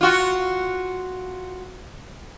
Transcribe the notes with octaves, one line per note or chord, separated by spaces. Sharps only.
F4 F#4